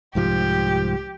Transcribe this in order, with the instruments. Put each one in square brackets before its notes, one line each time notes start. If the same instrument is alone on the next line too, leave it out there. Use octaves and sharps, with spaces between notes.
[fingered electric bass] C2 G#2 F3 [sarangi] G4